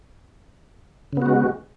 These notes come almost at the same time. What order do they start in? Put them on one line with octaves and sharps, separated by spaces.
C#3 B3 F#4 G#3